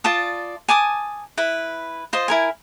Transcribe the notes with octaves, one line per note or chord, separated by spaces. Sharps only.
F4 D5 A5 D#6
G#5 A5 D6 D#6
E4 B4
F4 C5 D#5
E4 A#4 G#5